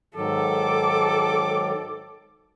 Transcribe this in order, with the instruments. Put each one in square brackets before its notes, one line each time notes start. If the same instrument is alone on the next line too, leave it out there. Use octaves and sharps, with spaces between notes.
[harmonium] G#2 D#3 F#3 [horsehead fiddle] A4 [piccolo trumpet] D6